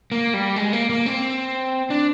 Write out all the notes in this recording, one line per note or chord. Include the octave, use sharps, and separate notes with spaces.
A#3
G3
G#3
A#3
A#3
C4
D4